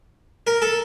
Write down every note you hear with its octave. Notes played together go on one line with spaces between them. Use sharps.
A#4
A4